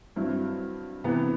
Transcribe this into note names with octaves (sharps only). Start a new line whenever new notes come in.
G2 F#3 C4 E4
C3 E3 B3